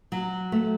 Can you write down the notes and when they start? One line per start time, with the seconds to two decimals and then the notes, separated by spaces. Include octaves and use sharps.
0.12 F#3
0.52 A3